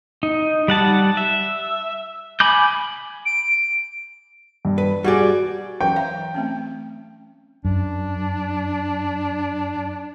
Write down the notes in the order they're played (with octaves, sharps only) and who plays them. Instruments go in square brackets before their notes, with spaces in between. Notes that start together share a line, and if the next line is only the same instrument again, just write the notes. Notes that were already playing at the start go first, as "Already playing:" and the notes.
[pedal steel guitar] D#4
G3 F#5 A5
E5
G#5 B5 D6 G6
[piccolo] D7
[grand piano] G2
[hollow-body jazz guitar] B4
[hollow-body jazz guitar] G3 G#4 D5 [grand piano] F#4 G#5
[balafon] E3 F#3 C#4 [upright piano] G5
[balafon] E5 F5 A#5
A3 C4 C#4
[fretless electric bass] F#2 [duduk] D4